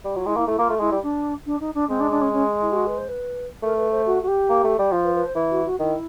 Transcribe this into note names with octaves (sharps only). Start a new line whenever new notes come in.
G3
F#3 F4
G#3 E4
A#3 E4
A3 E4
A#3 F4
A3
G#3 E4
G3
D4
D4
D#4
D4
G#3 C4
D4
D4
C#4
C#4
E4
G4
F#4
B4
C5
B4
A3 A#4
B4
C5
F#4
F#4
G4
A#3
A3
G3
F3
B4
B4
C5
E3
F#4
F#4
D#3 E4